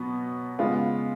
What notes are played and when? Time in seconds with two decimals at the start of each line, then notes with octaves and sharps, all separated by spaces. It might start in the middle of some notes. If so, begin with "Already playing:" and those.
Already playing: B2 F#3 B3
0.59 C#3 G#3 B3 F4